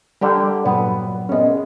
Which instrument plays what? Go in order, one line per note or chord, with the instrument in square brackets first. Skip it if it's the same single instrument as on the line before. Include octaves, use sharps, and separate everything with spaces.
[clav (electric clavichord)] D3 G4 A#4 [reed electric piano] G3
[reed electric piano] G2 A#2 F#3 [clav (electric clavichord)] B3
[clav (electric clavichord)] C2 G#3 [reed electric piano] B3 C#4